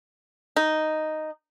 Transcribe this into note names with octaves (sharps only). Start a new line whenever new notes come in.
D#4